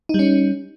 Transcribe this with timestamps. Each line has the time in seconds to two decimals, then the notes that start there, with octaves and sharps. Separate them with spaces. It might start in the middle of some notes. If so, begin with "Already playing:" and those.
0.09 D#4
0.14 G3
0.19 C#4